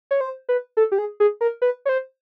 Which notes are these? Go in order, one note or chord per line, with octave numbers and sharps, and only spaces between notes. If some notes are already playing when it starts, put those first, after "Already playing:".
C#5
C5
B4
A4
G4
G#4
G#4
A#4
B4
C#5
C5